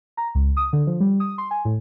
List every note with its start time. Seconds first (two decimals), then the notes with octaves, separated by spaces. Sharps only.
0.17 A#5
0.35 C#2
0.57 D#6
0.73 D3
0.87 F3
1.00 G3
1.20 D#6
1.38 C6
1.51 G#5
1.65 A2